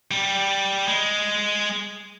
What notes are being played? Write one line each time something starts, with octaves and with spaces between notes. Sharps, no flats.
G3
G#3